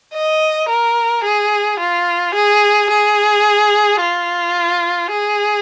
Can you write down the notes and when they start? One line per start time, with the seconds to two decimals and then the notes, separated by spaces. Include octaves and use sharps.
0.14 D#5
0.69 A#4
1.24 G#4
1.79 F4
2.34 G#4
2.90 G#4
4.01 F4
5.11 G#4